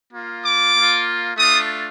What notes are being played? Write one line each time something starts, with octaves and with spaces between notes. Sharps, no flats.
A#3 F4
D6
A#3 F4
A3 D4 F4 D#6